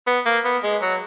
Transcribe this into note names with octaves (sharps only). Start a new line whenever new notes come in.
B3
A#3
B3
G#3
F#3